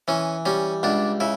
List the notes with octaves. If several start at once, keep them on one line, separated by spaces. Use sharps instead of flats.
E3 C#4
G3 C#4
C#2 D4
C#3 E4